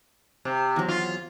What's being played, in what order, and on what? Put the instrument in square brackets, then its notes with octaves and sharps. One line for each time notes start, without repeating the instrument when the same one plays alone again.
[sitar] C3
[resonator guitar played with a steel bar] E2 F#3
[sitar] F4